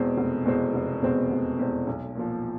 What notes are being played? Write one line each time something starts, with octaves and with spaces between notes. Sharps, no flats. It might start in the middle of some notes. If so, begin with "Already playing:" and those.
Already playing: E2 B2 G#3 C4
F1
E2 B2 G#3 C4
F1
E2 B2 G#3 C4
F1
E2 B2 G#3 C4
B1
A#2 F3